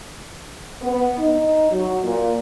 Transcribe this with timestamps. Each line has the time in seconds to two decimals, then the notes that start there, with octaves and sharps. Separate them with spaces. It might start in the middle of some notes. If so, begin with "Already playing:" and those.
0.82 B3
1.19 D#4
1.70 F#3
2.03 A#2